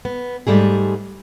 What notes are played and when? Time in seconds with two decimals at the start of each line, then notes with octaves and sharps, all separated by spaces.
0.05 B3
0.47 G#2 G3 A3 G#4